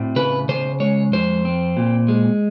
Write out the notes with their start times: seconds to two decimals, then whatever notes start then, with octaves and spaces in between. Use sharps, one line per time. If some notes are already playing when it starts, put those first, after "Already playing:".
Already playing: A2 C4
0.16 C#3 B4
0.49 C#3 C5
0.80 G#3 C#5
1.13 F2 C5
1.45 C4
1.77 A#2
2.08 G#3